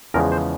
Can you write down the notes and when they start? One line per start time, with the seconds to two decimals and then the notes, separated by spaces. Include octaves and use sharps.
0.14 E2 C#3 F3 G#3 A#4
0.32 C5